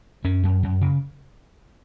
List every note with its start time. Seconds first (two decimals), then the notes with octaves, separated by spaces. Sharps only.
0.24 F#2 C#4
0.43 F#2
0.63 F#2
0.81 C#3